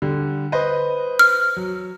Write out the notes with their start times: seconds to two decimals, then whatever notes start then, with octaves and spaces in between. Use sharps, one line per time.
0.02 D3 G3
0.52 B4 C5 D#5
1.19 F6
1.56 F#3